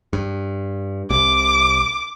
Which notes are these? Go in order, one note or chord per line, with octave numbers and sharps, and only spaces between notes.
G2
C2 C3 D6